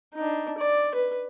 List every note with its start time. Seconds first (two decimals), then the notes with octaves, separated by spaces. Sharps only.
0.14 D4 D#4
0.58 D5
0.95 B4